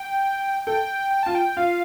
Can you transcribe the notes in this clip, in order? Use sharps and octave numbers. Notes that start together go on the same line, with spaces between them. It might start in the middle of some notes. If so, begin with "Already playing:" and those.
Already playing: G5
A4 G5
G5
F4 A5
G5
F4 F5